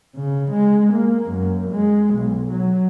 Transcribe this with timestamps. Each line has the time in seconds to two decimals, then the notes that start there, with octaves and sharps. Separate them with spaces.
0.15 C#3
0.51 G#3
0.93 A#3
1.26 F#2
1.71 G#3
2.15 B1
2.51 F#3